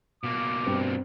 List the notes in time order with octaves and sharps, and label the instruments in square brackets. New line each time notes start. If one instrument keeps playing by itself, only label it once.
[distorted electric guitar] B2 A#3 [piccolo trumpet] D6
[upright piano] G2 [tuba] C4